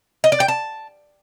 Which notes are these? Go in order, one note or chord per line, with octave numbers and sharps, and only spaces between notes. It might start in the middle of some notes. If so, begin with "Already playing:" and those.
D#5
D5
G5
A5